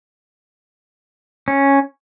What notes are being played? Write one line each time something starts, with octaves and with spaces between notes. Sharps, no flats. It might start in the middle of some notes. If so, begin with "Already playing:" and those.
C#4